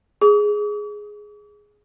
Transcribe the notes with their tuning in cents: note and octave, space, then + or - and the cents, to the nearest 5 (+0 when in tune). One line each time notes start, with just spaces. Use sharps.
G#4 +0 D6 -45